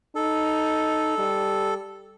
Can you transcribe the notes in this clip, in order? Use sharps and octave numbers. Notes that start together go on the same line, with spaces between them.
D#4 A4
G3